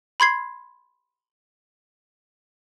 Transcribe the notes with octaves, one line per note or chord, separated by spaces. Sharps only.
B5 C6 G#6 C7